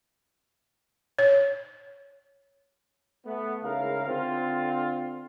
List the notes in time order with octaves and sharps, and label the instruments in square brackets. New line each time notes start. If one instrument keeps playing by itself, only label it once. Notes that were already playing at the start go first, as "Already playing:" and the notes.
[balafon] C#5
[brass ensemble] A3 B3
G#2 C#3 E4 A#4 F5
D3 C4 F4